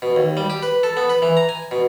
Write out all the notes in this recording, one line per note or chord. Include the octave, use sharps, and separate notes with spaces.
B2
D#2
G3
G4
B4
A4
B3
B4
E3
A#5
G#5
B2